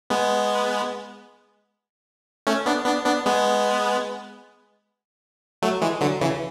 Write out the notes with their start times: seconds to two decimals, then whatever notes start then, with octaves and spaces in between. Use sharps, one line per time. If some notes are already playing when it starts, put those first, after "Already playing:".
0.10 G#3 B3
2.47 A3 C#4
2.66 B3 D4
2.86 B3 D4
3.06 B3 D4
3.26 G#3 B3
5.62 F#3 A3
5.81 E3 G#3
6.01 D3 F#3
6.21 C#3 E3